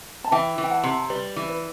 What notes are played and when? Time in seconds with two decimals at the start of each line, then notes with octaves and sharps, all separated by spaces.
0.24 A5
0.31 E3 E5 G5
0.58 E3
0.64 G5
0.70 F#5 A5
0.84 C3
1.10 G3 B4 D5
1.36 E3
1.49 B4